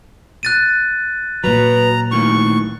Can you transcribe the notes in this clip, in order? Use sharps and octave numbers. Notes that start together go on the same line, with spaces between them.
F#6 A6 D#7
A#2 F#3 F#4 B4 A#5
A2 D#3 A#3 C#6